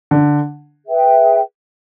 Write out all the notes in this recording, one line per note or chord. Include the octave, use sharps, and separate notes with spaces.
D3
G#4 B4 E5 G5